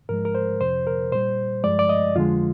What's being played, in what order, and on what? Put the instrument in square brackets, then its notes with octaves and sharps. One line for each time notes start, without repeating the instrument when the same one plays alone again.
[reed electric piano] G#2 F3 G#3 A#4
A#4
C5
F2 C3 F3 C5
A#4
A#2 G3 C5
G2 F3 G#3 D5
D5
D#5
F2 D3 F3 G#3 F4